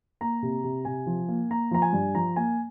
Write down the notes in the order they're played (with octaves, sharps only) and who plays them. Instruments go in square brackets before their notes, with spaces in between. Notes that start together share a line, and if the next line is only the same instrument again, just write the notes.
[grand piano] A#3 A#5
C3
C3
C3 G#5
F3
A#3
A#3 A#5
F3 A#5
G#5
G2
F3 A#5
A#3 G#5